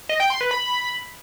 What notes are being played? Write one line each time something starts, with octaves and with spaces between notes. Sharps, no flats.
D#5
G5
C6
B4
B5